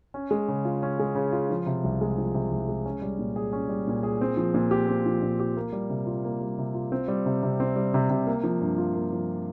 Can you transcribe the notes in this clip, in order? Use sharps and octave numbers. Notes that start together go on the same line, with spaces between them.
C#4
G#3
C#3
F4
C#4
G#3
C#3
F4
F3
C3
C2
G#3
F3
C3
C2
G#3
C#4
G3
A#2
G#4
C#4
G3
A#2
G#4
C4
F3
A#2
G4
C4
F3
A#2
G4
A#3
G3
C3
F4
A#3
G3
C3
F4
C4
G3
C3
C3
C4
G3
C3
C3
A#3
F3
G2
F4
A#3
F3